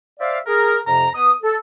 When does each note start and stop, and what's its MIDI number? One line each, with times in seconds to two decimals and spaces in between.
0.20 0.38 72
0.20 0.38 74
0.20 0.38 76
0.20 0.38 77
0.47 0.77 68
0.47 0.77 70
0.87 1.09 41
0.87 1.09 48
0.87 1.09 82
1.14 1.32 59
1.14 1.32 71
1.14 1.32 87
1.42 1.56 69